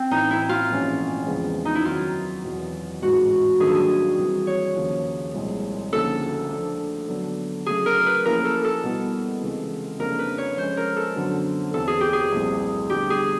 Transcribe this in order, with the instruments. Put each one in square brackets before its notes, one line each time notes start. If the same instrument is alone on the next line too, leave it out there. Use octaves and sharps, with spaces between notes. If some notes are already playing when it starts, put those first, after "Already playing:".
Already playing: [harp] C4
[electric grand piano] A1 A2 E3 [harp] D#4
[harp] E4
F4
[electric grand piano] A#1 G#2 E3 A3 C#4
E2 C#3 F3 G#3 B3
[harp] D#4
E4
[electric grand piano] F#2 D#3 F#3 [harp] F4
[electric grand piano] E2 B2 F#3
[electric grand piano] A1 G#2 E3 G#3 [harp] F#4
[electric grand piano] G2 D#3 F#3 A#3 D4 [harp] G#4
[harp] A4
G#4
[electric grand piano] C3 E3 G3
[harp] C#5
[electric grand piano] D#2 C#3 F3 A#3
C2 A#2 F3 G#3
[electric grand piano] D2 C#3 F3 A#3 D#4 [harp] A4
[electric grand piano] F3 A3 D4
D3 F#3 B3 D4
[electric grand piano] C#3 F#3 A3 [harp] G#4
[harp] A#4
B4
[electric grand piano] F3 A#3 C#4 E4 G4 [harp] A#4
[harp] A4
A4
[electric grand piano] B2 G3 B3 E4
C#2 C3 E3 G#3
[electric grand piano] F2 C#3 F3 A#3 D4 [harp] A#4
[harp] B4
C#5
[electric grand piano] F3 G#3 C#4 [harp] C5
[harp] A#4
A4
[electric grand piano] F#2 D3 F#3 B3
[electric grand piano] E2 C3 E3 [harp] A4
[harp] G#4
G4
G#4
[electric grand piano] C2 A#2 F3 A3 C4
[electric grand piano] D3 G3 B3 [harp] G4
[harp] G#4